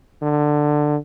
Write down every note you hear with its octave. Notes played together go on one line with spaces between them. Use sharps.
D3